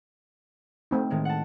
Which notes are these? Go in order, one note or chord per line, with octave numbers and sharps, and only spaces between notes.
A3 C4 D#4
A2 D#3 G#3
F#5 A5